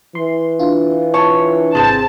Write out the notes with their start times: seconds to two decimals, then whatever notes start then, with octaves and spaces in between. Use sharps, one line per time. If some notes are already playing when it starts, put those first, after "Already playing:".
0.15 E3 C6
0.59 D4 F4
1.14 C#5 A5
1.75 G#1 C3 G#3 A#3 C4 A5